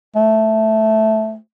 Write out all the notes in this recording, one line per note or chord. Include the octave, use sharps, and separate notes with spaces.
A3